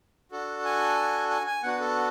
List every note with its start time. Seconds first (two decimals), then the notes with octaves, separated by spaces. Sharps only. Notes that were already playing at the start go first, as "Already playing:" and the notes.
0.31 D4 F#4 A4
0.65 G#5
1.30 G#5
1.47 G#5
1.63 B3 D4 F#4 F#5
1.80 A4